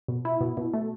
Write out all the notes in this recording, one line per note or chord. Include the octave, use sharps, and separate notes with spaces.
B2
E4
B2
B2
A3